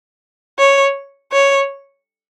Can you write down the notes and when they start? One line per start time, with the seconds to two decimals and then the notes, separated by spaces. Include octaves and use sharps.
0.59 C#5
1.32 C#5